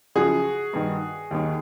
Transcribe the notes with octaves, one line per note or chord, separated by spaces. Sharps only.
F#2 C#3 F3 F#4 G#4
G2 D#3
D#2 D#3